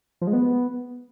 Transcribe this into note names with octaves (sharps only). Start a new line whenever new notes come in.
F3
G#3
B3